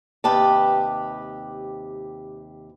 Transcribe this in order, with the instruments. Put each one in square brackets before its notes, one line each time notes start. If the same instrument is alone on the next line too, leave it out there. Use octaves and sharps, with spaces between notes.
[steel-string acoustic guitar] D#2 C3 G4 B4 A5